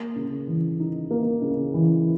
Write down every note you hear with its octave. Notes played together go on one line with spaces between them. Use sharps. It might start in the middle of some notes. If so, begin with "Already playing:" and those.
Already playing: A#3
C#3
E3
D#4
A#3
C#3
E3